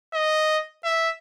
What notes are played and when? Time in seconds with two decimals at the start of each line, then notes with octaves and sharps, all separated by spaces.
0.14 D#5
0.85 E5